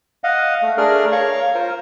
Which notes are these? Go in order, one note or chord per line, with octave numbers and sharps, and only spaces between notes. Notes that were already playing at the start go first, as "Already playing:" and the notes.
D#5 F5 F#5
A3
A3 D4 G#4 A#4 D5 F6
A#4 C#5 F5 C#6
F4 A#4 C5